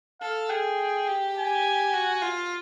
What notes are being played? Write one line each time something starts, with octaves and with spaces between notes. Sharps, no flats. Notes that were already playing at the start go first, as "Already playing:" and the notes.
A4 F5
G#4 G5
G4
G#5
F#4
F4